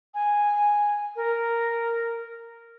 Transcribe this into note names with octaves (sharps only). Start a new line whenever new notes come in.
G#5
A#4